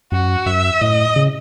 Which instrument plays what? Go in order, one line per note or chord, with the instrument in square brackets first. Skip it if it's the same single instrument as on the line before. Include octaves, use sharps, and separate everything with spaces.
[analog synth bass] F#2 [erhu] F#4
[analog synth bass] F#2 [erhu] E5
[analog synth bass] A2 [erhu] D#5
[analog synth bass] C#3